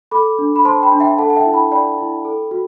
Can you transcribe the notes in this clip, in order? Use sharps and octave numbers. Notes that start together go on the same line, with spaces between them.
A4 B5 D6
D4
B5
C5 A5 C6
G5 B5
D4
E5 G5
A4 F#5 A5
A5
E5 G5
E4
G5 B5
D5 G5 B5
E4
A4
F#4